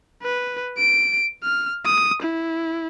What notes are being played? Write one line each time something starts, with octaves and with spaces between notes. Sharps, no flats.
B4
D7
F6
D#6
E4